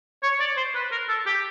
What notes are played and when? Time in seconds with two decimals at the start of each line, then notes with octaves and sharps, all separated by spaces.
0.23 C#5
0.40 D5
0.57 C5
0.75 B4
0.92 A#4
1.09 A4
1.26 G4